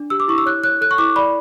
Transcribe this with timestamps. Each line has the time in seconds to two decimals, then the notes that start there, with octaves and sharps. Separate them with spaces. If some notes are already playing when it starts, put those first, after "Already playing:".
Already playing: D4
0.10 G4 E6
0.20 D6
0.28 E4 C#6
0.38 E6
0.46 C#5 F#6
0.64 C#5 F#6
0.81 A4 F#6
0.91 C#6
0.98 E4 D6
1.16 D5 B5